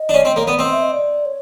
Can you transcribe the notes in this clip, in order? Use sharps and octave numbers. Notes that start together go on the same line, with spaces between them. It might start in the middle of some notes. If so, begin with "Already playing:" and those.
Already playing: D#5
D4
C#4
C4
A#3 C#5
B3 D5
C4 D#5
E5
D#5
D5
C#5